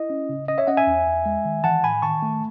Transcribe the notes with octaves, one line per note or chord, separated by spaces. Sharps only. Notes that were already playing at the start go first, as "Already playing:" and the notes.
Already playing: E4 D#5
C#4
C#3
C#4 D#5
C#5 E5
C#4 D#5 F#5
E5 G#5
E2
E2
G#3
D#3
E3 F#5 A5
A2 G#5 B5
D#3 A5 C#6
A3